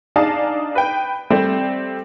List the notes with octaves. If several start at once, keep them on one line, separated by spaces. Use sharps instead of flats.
D4 D#4 G#4 D5 F5 A5
B4 G5
G3 A3 C4